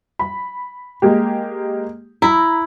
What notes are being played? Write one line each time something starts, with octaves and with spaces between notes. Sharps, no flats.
B5
G#3 A#3 G4
E4 A#5 B5